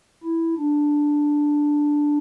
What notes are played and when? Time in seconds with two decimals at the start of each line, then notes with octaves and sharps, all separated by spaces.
0.23 E4
0.57 D4